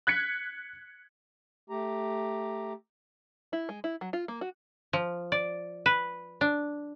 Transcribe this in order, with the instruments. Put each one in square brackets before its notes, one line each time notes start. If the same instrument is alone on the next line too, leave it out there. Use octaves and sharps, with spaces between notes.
[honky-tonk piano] F#6 G#6 B6 C#7
[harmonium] A3 G4 A#5
[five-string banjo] E4
G#3
E4
F#3
F4
A#3
F#4
[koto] F3
D5
B4
D4